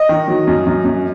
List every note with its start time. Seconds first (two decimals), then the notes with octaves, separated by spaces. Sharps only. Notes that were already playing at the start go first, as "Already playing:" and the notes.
Already playing: D#5
0.09 D#3
0.28 F#3
0.47 F#2
0.66 F#2
0.84 F#2